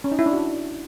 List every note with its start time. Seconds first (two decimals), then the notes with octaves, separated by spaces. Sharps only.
0.04 C#4
0.12 D#4
0.19 E4
0.26 D4
0.33 F#4